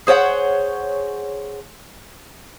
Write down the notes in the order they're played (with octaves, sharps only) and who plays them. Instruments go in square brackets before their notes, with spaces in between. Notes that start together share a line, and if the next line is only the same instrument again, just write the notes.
[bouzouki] G#4 C5 C#5 F#5